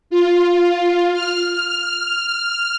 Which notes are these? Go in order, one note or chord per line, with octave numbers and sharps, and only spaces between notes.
F4
F6
F6